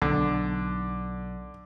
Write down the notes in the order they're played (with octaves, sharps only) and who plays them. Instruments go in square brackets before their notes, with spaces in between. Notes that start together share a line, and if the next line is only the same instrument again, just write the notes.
[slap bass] B1 [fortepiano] D3